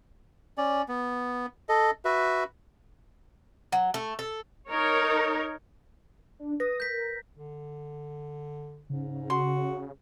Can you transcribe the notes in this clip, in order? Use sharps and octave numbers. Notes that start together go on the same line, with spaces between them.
C#4 D5
B3
A4 D#5
F#4 B4 E5
F#3
A3
A4
D#4 A#4 C#5
D4
B4 D#6 A#6
A#4 G6 B6
D3
G#2 C#3
F#4 C6